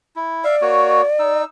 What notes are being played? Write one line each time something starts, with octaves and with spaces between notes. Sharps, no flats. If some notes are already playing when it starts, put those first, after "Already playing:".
E4
D5 E5 F5
A#3 F#4 C#5
D#4 E6